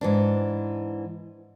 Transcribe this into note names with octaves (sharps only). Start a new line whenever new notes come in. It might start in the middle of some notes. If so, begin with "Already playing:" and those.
G#2 E3 D4